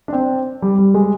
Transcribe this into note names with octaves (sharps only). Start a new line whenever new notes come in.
D4
C4
G3
G3
G#3